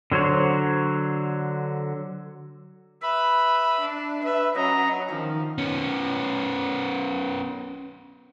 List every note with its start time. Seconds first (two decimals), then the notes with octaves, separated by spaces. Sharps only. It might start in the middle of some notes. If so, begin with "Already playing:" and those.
0.12 D3 F#3 C5 C#5
3.02 B4 E5 B5
3.81 D4
4.24 B4 E5
4.56 F#3 C#4 D#5 A#5
5.10 D#3 F3
5.58 B3 C#4